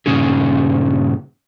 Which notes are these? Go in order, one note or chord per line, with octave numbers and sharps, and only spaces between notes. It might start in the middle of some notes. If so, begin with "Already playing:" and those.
G2 A#2 C#3 C#4 D#4 G#4